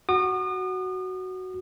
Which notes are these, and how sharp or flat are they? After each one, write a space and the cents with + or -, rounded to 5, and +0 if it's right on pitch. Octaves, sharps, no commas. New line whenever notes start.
F#4 +5 D#6 -40